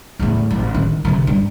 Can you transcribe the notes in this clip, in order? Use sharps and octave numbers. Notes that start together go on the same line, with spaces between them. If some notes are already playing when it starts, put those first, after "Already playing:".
E2 A2
A1
D#3
C3 D#3
G2